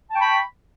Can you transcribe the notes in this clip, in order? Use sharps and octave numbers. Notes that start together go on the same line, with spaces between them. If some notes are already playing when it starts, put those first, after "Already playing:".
G5 A5 B5 C#6